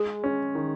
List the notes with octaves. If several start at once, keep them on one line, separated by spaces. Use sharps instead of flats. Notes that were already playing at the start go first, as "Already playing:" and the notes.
Already playing: G#3 G#4
C#4
D#3